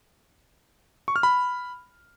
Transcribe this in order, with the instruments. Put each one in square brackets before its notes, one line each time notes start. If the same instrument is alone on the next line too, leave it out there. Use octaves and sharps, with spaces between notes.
[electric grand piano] C#6
F6
B5